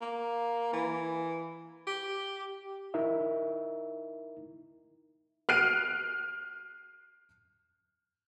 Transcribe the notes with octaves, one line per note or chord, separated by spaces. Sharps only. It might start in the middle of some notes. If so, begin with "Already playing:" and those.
A#3
E3
G4
D#4 E4 A#4 E5
F6 F#6 C7 D7 D#7